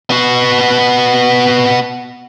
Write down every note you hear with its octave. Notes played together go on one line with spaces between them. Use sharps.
B3 F#4